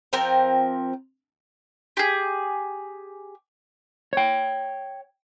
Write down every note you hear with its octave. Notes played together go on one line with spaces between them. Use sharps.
F3 C4 A#4 G5
G4 G#4
C#5 G5